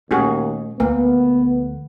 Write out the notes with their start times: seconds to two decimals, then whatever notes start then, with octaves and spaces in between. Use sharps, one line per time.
0.11 D#2 A#2 A3 C#4 F#4 G#4
0.80 D2 F3 A#3 B3